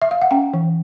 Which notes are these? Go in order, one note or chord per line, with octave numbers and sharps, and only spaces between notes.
E5
F5
F#5
C#4 G5
E3